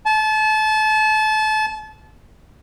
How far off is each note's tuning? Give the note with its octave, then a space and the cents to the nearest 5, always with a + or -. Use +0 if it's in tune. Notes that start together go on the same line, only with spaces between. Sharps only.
A5 -30